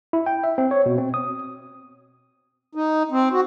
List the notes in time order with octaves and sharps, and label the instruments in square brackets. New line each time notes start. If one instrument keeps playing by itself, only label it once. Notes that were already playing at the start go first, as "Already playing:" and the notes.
[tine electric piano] E4
G5
E5
C4
C#5
B2
C4
D#6
[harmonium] D#4
C4
F#4